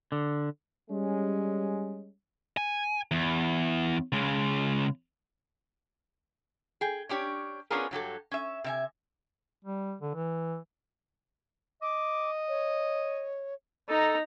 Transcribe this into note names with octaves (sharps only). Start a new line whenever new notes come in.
D3
G3 G#3 C#4
G#5
E2
C#3 G#3
G#4 G5
C#4 D4 G4 C#5
B3 C#4 D4 F4 G#4 A#4
G2 F#3 G4 A4
C#4 E5
C3 E5 G#5
G3
D3
E3
D#5 D6
C#5
D#4 A4 A#5